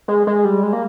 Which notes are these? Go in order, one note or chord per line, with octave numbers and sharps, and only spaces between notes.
G#3
G#3
G3
G#3
A#3